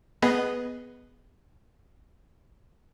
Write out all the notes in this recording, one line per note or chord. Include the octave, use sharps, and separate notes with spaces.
B3 G#4 B4 D#5